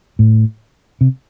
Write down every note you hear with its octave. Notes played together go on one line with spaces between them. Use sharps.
A2
C3